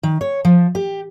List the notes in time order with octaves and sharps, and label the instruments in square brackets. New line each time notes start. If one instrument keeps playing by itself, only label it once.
[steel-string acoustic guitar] D#3
C#5
F3
G4